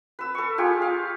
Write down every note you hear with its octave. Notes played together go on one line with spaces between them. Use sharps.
B4 E6
A4 C#6
F4 G4 G#4
F5